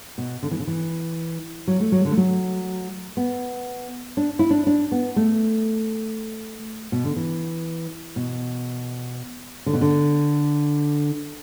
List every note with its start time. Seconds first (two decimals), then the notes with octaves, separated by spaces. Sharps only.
0.18 B2
0.43 D3
0.51 E3
0.59 D3
0.67 E3
1.68 F#3
1.80 A3
1.92 F#3
2.05 D3
2.11 A3
2.17 F#3
3.17 B3
4.17 D4
4.39 E4
4.50 D4
4.67 D4
4.92 B3
5.16 A3
6.92 B2
7.04 D3
7.16 E3
8.16 B2
9.66 D3
9.73 B2
9.81 D3